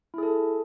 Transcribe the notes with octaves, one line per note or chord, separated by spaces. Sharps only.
E4 G#4 A4